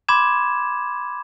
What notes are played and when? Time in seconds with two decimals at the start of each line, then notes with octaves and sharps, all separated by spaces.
0.08 B5 C6 D6 G#6 E7